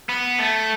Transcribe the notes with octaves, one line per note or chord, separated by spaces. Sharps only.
B3
A3